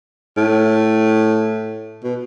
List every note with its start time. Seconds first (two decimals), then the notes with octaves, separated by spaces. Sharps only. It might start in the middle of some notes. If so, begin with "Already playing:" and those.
0.37 A2
2.04 B2